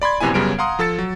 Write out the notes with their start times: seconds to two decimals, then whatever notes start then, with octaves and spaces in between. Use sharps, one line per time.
0.02 D5 B5 C6 G#6
0.20 A#1 F#2 C3 B3 E4 G#5
0.34 F#2 C#3 G3 B3 D7
0.58 F5 F#5 A#5 C6 D#6
0.79 F3 A4 E6 A6 C#7
0.99 F#3